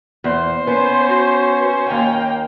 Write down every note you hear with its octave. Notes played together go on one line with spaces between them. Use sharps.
E2 C5
B3 C#4
F#4
D#2 A#3 G5 G#5